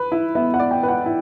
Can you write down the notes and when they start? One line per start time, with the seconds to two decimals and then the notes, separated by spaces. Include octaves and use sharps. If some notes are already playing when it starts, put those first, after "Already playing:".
Already playing: B4
0.12 E4
0.35 B3 E5
0.54 F#5
0.60 D5
0.71 G5
0.83 B4
0.88 F#5
1.06 E4